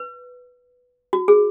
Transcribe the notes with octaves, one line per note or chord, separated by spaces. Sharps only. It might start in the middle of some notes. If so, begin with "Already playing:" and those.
Already playing: B4
F#4
G#4